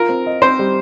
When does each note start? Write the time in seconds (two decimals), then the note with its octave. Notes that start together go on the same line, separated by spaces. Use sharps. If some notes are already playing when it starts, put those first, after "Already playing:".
Already playing: F4 A#4
0.09 C4
0.26 D#5
0.42 C4 C5
0.59 G3